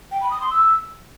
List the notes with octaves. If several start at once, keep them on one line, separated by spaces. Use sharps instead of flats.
G5
B5
D#6
C6
E6